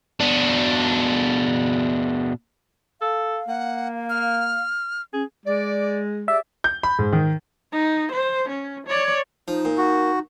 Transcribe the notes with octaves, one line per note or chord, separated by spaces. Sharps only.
B2 D4
A4 F5
A#3 F#5
F6
C#4 G#4
G#3 D5
G4 G#4 D5 E5
G6
B5
G#2
D#3
D#4
C5
C#4
C#5 D5
F3 D#4
A#2
F#4